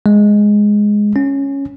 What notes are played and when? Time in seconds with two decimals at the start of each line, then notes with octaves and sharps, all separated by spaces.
0.06 G#3
1.16 C#4